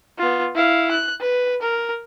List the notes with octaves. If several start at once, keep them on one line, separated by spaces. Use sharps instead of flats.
B3 F4
E4 F5
F#6
B4
A#4